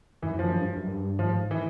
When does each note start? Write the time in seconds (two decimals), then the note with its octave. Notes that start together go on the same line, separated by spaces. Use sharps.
0.22 F#2 E3
0.39 F3
0.55 G2
0.77 F#2
0.87 G2
1.19 G#2 F3
1.51 E3